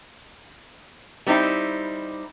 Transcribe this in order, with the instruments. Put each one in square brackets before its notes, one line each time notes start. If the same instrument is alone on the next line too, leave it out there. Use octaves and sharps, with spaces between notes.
[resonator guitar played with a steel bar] G3 C4 D#4 E4